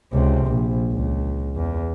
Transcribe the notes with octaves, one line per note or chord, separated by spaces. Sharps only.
C#2 C3
A#1
C#2
E2